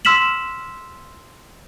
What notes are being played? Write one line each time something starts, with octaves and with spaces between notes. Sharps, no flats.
C6 E6 F6 B6 E7 F#7